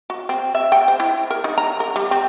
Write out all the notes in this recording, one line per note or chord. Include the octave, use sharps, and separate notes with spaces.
F#4
C4
E5
G5
C5
E4
A#4
D#4
A#5
A#4
G3
C4